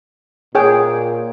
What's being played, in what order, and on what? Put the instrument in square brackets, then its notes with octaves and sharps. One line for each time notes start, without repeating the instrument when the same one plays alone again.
[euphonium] A#2 [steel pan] G#4 C#5 G5